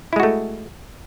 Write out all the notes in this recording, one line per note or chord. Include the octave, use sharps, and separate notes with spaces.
G#3 A3 E4 F#4